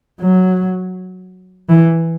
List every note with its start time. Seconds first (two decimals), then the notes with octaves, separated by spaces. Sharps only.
0.21 F#3
1.69 E3